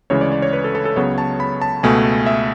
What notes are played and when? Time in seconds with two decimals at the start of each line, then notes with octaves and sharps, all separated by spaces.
0.10 D2 C#3 E3 G#3 C#5
0.21 D5
0.32 D5
0.42 C#5
0.53 B4
0.64 A4
0.75 A4
0.85 A4
0.96 C#2 C#3 F#3 B3 C#5
1.18 A5
1.40 B5
1.62 A5
1.83 C#2 B2 A3 G#5
2.26 E5